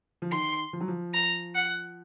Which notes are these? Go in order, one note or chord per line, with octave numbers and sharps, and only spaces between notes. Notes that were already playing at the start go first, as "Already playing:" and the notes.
F3
D#3 C6
F3
F#3
F3
A#5
F#5